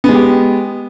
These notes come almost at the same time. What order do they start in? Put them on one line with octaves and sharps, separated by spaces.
B3 G#3 G4